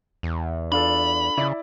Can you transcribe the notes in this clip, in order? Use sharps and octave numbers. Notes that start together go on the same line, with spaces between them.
E2
D4 F4 A4 B5
C#3 E4 D5